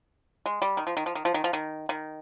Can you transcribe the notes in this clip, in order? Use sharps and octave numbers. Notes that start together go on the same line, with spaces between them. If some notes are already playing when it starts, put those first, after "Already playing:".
G#3
G3
D#3
F3
D#3
F3
D#3
F3
D#3
F3
D#3
D#3